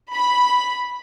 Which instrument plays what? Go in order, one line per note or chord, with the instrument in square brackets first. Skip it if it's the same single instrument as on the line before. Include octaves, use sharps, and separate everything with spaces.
[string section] B5